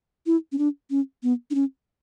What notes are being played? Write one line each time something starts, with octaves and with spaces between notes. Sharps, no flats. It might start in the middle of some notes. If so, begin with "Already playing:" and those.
E4
C#4
D4
C#4
B3
D4
C#4